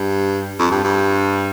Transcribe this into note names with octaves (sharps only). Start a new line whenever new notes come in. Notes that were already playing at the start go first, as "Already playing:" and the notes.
Already playing: G2
F2
G2
G2